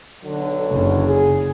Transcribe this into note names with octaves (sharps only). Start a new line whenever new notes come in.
B1 D3 F#3
F#1 C#3
G#4